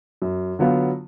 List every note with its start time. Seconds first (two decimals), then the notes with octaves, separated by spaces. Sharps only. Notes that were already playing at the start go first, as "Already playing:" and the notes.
0.22 F#2
0.59 D3 F#3 B3 F4